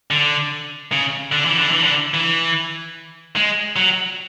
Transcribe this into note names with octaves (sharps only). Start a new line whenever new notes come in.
D3
C#3
D3
E3
D3
E3
D3
E3
G#3
F#3